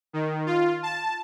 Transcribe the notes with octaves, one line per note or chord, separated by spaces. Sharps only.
D#3
F4
A5